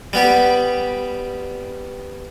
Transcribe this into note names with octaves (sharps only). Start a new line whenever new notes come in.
G3 B3 G4